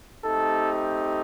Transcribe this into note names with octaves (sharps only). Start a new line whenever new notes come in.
A3 C4 D#4 G4 A4